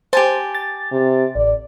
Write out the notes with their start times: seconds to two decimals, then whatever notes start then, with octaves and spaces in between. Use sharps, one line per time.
0.13 G4 C5 G#5 A5
0.55 A6
0.92 C3
1.36 A1 D5